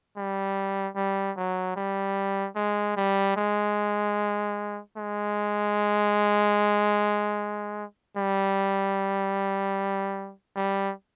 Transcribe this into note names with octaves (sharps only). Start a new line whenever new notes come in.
G3
G3
F#3
G3
G#3
G3
G#3
G#3
G3
G3